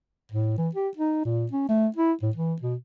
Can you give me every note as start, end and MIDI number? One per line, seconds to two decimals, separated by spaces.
0.32 0.56 45
0.58 0.69 52
0.75 0.88 67
0.97 1.24 63
1.25 1.46 46
1.51 1.65 61
1.68 1.87 57
1.96 2.12 64
2.22 2.30 45
2.35 2.55 52
2.62 2.75 47